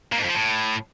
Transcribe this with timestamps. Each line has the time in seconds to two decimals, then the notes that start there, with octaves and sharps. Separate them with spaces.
0.12 A#2
0.18 G#2
0.23 F2
0.29 F3
0.35 A2